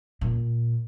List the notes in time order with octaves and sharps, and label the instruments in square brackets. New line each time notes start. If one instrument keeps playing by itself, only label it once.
[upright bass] A#2